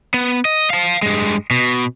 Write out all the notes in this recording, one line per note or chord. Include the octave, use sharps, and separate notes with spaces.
B3
D#5
F5 A5
G2 G#3
B2